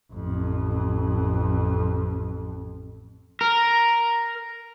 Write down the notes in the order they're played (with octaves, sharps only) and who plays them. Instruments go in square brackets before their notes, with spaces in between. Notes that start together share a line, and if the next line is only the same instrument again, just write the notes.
[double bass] A1 F2
[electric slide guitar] A#4